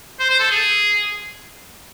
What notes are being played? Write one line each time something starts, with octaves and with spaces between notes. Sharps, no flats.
C5
C5
A4
G#4